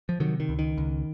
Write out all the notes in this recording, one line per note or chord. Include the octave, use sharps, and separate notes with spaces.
F3
C3 D#3 F#3
D#3
C#2
D#3
C#2